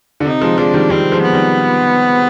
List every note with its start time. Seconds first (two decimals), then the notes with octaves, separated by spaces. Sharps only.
0.20 D3
0.25 C3 D#4
0.41 F3 G#3
0.58 F3 G#3 D4
0.74 D#3 G3
0.90 D#3 G3 C4
1.12 F3 G#3
1.22 B3
1.33 D#3 G3